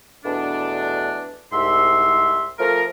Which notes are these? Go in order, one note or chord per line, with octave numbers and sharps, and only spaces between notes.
E2 B2 A3 B3 D4
C2 G#2 E5 C6
F3 A3 A#4